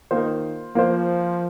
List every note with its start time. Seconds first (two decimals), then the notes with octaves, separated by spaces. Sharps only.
0.10 D#3 A#3 F4 C5
0.75 F3 A#3 F4 C5